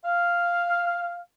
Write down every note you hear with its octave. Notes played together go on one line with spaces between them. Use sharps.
F5